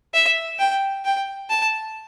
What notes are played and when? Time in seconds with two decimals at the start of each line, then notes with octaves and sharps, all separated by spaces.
0.14 E5
0.59 G5
1.05 G5
1.50 A5